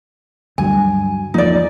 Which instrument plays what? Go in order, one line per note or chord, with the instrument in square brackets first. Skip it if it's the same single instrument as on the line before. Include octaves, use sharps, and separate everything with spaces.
[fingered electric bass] D2 G2 F#3 [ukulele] G#5
[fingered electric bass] E2 F3 A#3 [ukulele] D#4 D5